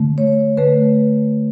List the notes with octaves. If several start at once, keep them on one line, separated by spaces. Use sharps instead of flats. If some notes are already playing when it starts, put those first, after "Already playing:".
Already playing: D3 A3
C#5
D3 A3 B4